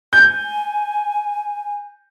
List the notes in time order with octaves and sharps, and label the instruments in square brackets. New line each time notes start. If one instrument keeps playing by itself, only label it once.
[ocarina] G#5 [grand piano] G6